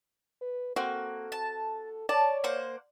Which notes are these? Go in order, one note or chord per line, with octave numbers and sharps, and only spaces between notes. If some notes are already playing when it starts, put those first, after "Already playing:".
B4
A#3 C4 F#4 A4
A5
C#5 D5 A5
A#3 C5 F#5